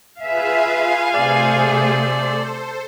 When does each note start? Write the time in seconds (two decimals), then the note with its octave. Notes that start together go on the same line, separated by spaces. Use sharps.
0.22 F4 G#4 B4 E5 F5 G#5
1.14 C3 A3 G#4 A4 C5 D5